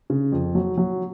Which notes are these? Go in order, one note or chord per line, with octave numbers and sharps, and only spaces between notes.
C#3
F2
F#3
F#3